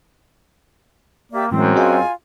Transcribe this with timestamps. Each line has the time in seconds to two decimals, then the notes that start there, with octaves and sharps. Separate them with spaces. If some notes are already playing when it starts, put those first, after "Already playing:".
1.32 A#3 G4 D5 E5
1.51 F#2 A2 E3 G#3 C4 C5
1.75 F4 F#4 G#4 D#5 G#5